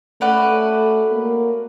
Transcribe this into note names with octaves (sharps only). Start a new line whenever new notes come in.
A3 C#4 F#4 B4 D5
A#3